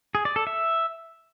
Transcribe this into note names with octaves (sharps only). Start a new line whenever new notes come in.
G#4
D5
A4
E5